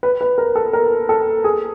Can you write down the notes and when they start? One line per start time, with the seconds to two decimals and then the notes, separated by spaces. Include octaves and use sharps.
0.03 B4
0.21 B4
0.38 A#4
0.55 A4
0.73 A#4
1.09 A4
1.44 G#4